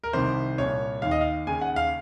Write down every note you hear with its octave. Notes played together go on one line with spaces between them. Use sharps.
A#4
C2 C3 D#3 C5
C2 A#2 C#5
D#2 D#3 F5
D#5
F5
D#2 C#3 G#5
F#5
F5